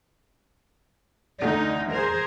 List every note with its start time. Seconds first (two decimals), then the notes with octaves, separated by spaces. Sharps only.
1.42 D2 D3 A3 D#4 D#5
1.89 G#4 A#4 C5